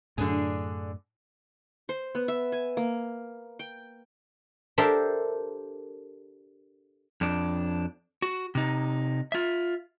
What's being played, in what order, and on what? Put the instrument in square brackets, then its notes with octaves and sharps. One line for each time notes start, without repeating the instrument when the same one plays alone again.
[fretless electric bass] F#2 A2 [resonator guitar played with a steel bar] D3 D4 G#4
[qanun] C5
B3
E5
G#5
A#3
G5
[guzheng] D4 G4 A4 A#4 C5 E5
[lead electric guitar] F2 D4
F#4
C3 D#4
F4 E5